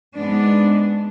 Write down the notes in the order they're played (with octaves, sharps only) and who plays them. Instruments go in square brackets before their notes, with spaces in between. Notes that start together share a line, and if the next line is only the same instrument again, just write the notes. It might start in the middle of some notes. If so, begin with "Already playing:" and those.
[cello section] G#2 G#3 B3 D4